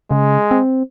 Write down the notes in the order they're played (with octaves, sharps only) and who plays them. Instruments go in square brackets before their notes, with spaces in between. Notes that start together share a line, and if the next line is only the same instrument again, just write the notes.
[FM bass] C#3 [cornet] G#3
[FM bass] C4